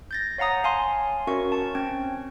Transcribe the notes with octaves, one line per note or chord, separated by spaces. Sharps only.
G6 A6 A#6
C#5 F5 F#5 A#5 D#6
C#5 F5 G#5 A5 C6
C#4 F#4 A#4 C#5 E5 C#6
A5 C#6
C4 C#4 G5 G#6